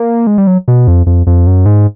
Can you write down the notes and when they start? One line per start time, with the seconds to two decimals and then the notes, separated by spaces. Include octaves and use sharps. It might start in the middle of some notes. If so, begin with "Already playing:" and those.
Already playing: A#3
0.27 G#3
0.38 G3
0.47 F#3
0.68 B2
0.87 F2
1.06 F2
1.27 F2
1.47 F#2
1.66 G#2